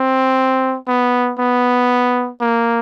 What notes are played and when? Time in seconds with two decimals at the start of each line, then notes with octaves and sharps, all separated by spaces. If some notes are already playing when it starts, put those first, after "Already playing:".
Already playing: C4
0.88 B3
1.39 B3
2.41 A#3